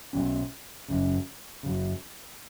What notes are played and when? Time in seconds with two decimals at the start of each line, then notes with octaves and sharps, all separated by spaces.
0.13 B1 B2 F#3 C#4
0.88 F#1 F#2 C#3
1.63 F#1 F#2 C#3